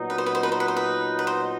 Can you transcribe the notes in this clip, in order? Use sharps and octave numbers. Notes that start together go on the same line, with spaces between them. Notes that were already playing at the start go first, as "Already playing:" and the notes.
Already playing: A#2 F#3 B3 D#4
B4
C5
B4
C5
B4
C5
B4
C5
B4
B4
C5